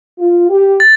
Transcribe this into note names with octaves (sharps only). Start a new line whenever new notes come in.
F4
G4
A6